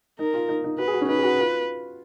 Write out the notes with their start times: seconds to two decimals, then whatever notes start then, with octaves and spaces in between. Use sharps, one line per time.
0.19 D#4 A#4
0.34 F4
0.49 D#4
0.64 D#4
0.78 F#4 B4
0.87 G#4
0.93 F#4
1.01 C#4
1.08 D#4 B4
1.18 G#4
1.23 F#4
1.38 F4